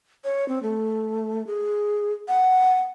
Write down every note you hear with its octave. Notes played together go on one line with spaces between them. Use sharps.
C#5
C4
A3
G#4
F#5